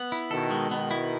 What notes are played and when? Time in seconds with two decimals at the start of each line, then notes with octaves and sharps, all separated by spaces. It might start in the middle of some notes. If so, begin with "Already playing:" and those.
Already playing: B3
0.12 E4
0.31 B2 D#3 A4
0.51 G#3
0.71 B2 D#3 B3
0.91 E4